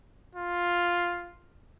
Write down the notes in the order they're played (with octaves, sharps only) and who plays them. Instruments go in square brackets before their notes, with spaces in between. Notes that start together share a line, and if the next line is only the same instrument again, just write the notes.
[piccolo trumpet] F4